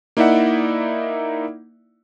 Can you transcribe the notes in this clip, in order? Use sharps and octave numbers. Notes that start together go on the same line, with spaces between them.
A#3 D#4 E4 D5 E5 F#5